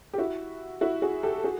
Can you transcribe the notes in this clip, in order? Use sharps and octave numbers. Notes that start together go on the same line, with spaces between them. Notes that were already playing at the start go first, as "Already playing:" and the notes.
G4
E4 F#4
E4 F#4
F#4 G#4
G4 A4
F#4 G#4